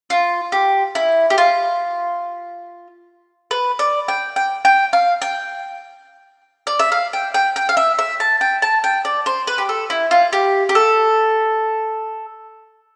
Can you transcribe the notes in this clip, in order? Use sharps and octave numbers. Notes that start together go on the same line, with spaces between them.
F4
G4
E4
G4
F4
B4
D5
G5
G5
G5
F5
G5
D5
E5
F5
G5
G5
G5
F5
E5
E5
A5
G5
A5
G5
D5
C5
B4
G4
A4
E4
F4
G4
G4
A4